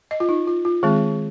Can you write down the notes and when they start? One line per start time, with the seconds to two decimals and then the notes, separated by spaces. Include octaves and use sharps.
0.11 D#5
0.20 F4
0.29 D#4
0.47 F4
0.65 F4
0.83 D#3 G#3 C4 G#4